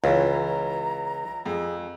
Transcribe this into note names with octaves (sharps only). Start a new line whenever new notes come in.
C#2 E3 C#4 F4 A#5
F2 G#4